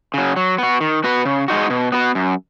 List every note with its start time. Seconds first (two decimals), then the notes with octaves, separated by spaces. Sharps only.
0.14 C#3 F#3
0.36 F#3
0.58 B3 F#4
0.81 D#3
1.04 B3 F#4 B4
1.25 C#3
1.48 G#3 D#4 F#4
1.70 B2
1.92 B3 F#4 B4
2.15 F#2